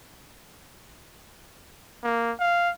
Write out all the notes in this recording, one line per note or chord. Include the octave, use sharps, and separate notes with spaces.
A#3
F5